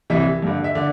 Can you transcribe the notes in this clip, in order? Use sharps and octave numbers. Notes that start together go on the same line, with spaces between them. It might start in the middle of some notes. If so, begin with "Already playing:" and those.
C2 C3 E3 E5
G2 D3
E5
D3 D5